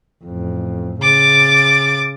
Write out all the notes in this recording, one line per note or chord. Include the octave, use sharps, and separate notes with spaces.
A1 F2
C#3 D6 A6